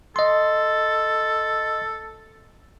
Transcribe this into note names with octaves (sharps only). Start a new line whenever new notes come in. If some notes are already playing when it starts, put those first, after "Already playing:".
A4 D#5 C6